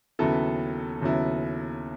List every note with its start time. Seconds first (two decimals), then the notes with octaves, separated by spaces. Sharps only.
0.19 D#2 C#3 F#3 B3 E4 A4
1.01 D#2 C#3 F#3 B3 E4